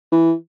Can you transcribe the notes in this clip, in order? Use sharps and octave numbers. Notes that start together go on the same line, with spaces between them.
E3